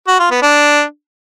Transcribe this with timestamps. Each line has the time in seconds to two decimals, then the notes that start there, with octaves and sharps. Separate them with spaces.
0.08 F#4
0.20 F4
0.31 B3
0.43 D4